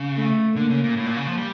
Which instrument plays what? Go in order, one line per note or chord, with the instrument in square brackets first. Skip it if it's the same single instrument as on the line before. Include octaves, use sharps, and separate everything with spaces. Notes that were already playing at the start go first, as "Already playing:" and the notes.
Already playing: [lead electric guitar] C#3
[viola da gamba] A3
[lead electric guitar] D3 [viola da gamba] A#3
[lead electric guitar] C#3
A#2
A2
A#2
C#3
F3
G3